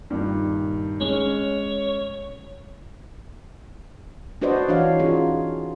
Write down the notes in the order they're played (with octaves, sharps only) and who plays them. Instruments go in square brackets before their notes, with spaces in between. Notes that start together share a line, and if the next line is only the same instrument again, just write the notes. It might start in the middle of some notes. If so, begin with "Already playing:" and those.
[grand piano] G2 A#2 D#3
[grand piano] G#3 C#4 [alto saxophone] C#5
[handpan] D4 F#4 B4 C5 D5 D#5
E3 D4 F#4 C#5 F5
C#4 D#4 F4 G#4